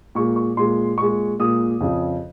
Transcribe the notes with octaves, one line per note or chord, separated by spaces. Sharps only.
A#2 G#3 C#6
C#6
A#2 G#3 C6
A#2 G#3 C#6
A#2 G#3 D#6
F2 C#3 F3